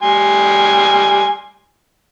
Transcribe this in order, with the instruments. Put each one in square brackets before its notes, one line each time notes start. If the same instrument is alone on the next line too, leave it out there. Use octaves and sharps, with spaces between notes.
[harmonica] G3 G#5 C6